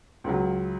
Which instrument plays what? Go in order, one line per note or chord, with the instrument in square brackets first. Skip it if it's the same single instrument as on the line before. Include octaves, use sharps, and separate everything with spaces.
[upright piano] C#2 C#3 F#3